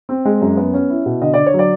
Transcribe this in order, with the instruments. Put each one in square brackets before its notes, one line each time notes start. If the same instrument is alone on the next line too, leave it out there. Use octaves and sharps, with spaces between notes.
[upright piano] C4
G#3
F#2
B3
C#4
E4
B2
D3 D#5
D3 D5
C#5
F#3
D5